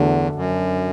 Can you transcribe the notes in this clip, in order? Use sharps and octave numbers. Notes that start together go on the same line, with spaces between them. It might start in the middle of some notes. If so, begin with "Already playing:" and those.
Already playing: E2 D3 A3 D4 F#4 A4
F#2